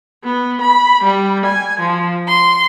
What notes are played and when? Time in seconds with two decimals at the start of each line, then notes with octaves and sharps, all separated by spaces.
0.23 B3
0.61 B5
1.04 G3
1.45 G#5
1.80 F3
2.28 C6